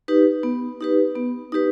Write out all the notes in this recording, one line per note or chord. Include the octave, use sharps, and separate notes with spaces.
D#4 G4 B4
B3
D#4 G4 B4
B3
D#4 G4 B4